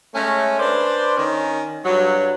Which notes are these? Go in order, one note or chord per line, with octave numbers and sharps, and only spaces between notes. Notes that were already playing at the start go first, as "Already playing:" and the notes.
G#3 A3 C#4
D4 B4 C5 D5
D#3 C#4
G2 F#3